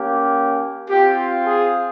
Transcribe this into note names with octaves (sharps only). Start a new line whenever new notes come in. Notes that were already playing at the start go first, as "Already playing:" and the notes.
Already playing: A#3 C#4 G4
C4 F4 G4
G#4